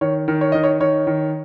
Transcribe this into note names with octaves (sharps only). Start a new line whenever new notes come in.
D#3 C#5
D#3
C#5
D#3 D#5
C#5
D#3 C#5
D#3